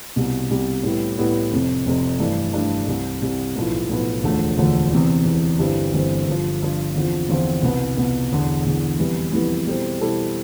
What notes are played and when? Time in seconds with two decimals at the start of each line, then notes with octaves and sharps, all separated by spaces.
0.16 C2 B2 G3
0.50 C2 B2 G3
0.83 A2 G3 B3 E4
1.17 A2 G3 B3 E4
1.52 F1 F2 C3
1.86 F1 F2 C3
2.20 G2 E3 A3 D4
2.53 G2 E3 A3 D4
2.87 C2 C3 G3
3.22 C2 C3 G3
3.56 B1 A2 F3 B3 E4
3.89 B1 A2 F3 B3 E4
4.23 E1 D2 D3 F3 A3
4.57 E1 D2 D3 F3 A3
4.91 E2 C3 E3
5.25 E2 C3 E3
5.59 G1 G2 E3 G3 C4
5.94 G1 G2 E3 G3 C4
6.27 G1 G2 F3
6.62 G1 G2 F3
6.96 E2 D3 F3 C4 F4
7.28 E2 D3 F3 C4 F4
7.62 C2 B2 B3
7.97 C2 B2 B3
8.31 E1 E2 D3
8.65 E1 E2 D3
8.99 F2 E3 G3 B3 E4
9.32 F2 E3 G3 B3 E4
9.67 B2 G3 C4 E4 A4
10.01 B2 G3 C4 E4 A4